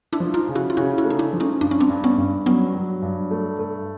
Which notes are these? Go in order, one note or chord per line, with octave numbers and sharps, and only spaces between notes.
D4 E4
F3
D#4 F4
C#3
E4 F#4
F4
C#3 E4 F#4
E4 F#4
A3
D#4
D4 E4
F3
C#4 D#4
G2 D4
C#4
C4 D4
G2
B3 C#4
G2
F#3 B3 C#4
F#3
G2
A3
A3